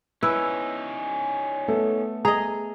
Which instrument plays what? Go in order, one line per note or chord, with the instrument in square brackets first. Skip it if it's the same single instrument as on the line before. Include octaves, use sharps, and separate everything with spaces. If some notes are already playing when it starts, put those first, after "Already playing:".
[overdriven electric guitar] C#4 D#4 [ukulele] E4 [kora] B4 [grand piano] E6
[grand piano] A3 B3 A4
[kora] G#4 D#5 [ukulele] A#5